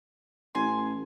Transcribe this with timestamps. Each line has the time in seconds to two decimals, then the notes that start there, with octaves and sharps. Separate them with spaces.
0.55 A1 G#5 C6